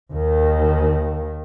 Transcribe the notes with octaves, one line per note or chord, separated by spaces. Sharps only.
D#2 D#3